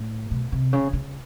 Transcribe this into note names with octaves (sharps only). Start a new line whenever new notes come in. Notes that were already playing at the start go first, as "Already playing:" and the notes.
Already playing: A2
B2
C3
C#3
C#3